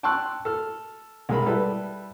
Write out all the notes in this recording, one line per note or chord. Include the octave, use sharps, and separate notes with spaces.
G5 A5 C6 C#6 E6 F#6
A4 F6
B1 G#3 A#4 B5
G3 E4 A4 B4